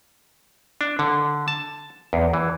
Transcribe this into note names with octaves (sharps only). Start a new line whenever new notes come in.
D4
D3
A5
E2
E3